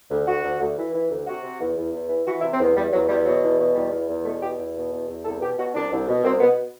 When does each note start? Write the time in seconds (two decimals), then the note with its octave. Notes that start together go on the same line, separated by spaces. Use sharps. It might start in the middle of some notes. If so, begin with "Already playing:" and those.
0.09 D2
0.26 D2 F#4
0.44 D2
0.60 D2
0.77 E3
0.92 E3
1.10 D2
1.26 C3 F#4
1.43 C3
1.60 E2
1.76 E2
1.93 E2
2.08 E3
2.25 E3 F#4
2.39 E4
2.42 C3
2.51 C4
2.59 E2 B3
2.75 E2 G3
2.93 E2 F#3
3.08 E2 G3
3.24 B2 F#3
3.42 E2
3.58 B2
3.74 E2 G3
3.91 E2
4.08 E2
4.24 B2 A3
4.41 E2 G4
4.58 E2
4.75 B2
4.92 E2
5.07 E2
5.24 C2 A4
5.40 B2 G4
5.58 B2 F#4
5.74 C2 D4
5.91 C2
6.08 B2
6.24 C2 C4
6.40 B2 B3